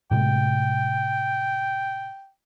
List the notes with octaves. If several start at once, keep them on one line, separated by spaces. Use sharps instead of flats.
A2 C3 G#3 G5